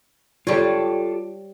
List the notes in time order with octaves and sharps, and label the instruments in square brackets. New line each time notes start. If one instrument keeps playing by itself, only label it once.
[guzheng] G3 C#5 [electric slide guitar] F4 G4 A4